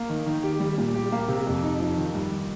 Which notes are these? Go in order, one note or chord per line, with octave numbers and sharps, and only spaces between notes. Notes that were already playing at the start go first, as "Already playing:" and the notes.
Already playing: A#3
D#3
D#3
G4
G3
A#2
G4
A#3
C3
F2
D#4
F3
D#3
G2